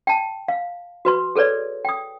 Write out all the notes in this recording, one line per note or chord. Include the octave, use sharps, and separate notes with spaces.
G5 A5
F5
F#4 B4 C6
G#4 A4 B4 C#5 D5
G5 D#6